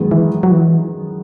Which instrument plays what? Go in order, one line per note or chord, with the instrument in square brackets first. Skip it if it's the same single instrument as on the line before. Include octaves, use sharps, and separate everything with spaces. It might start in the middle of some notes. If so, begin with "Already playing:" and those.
Already playing: [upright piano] F#2 D#3 G#3 B3
[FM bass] E3
F#3
E3